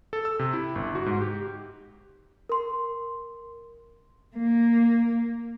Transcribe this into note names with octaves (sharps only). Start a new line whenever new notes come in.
A4
E6
C3
E4
G1
F#4
G#2
G4
A#4 C6
A#3